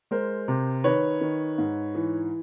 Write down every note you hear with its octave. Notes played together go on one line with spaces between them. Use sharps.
G#3 A#4 C5
C3
D#3 B4 C#5
D#3
G#2
E3